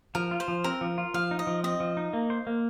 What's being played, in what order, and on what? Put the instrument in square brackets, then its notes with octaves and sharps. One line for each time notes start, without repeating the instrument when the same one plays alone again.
[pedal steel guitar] F3 [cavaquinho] A#4
[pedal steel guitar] F4
[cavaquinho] C5
[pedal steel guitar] F3
[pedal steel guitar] C4 [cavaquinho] A#4
[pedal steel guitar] F3
F4
[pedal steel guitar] F3 [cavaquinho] F5
[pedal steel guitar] D#4
[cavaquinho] D#5
[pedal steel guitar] F3
[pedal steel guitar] C4 [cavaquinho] D#5
[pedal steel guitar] F3
D#4
A#3
C5
A#3